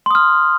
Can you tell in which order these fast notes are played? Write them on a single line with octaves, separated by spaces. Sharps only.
C6 D#6 F6